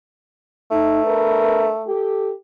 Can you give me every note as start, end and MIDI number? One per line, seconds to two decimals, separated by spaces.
0.71 1.89 57
0.71 1.04 63
1.04 1.70 62
1.04 1.70 70
1.04 1.70 71
1.86 2.29 67
1.86 2.29 69